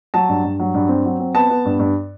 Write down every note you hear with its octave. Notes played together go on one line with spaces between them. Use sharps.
F#3 A5
G2
G2
F#3
G2
C4
F#3
C4
B3 A5
B3
G2
G2